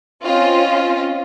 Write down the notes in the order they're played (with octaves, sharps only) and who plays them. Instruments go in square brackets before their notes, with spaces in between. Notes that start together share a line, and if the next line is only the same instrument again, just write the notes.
[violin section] C4 C#4 F4 D#5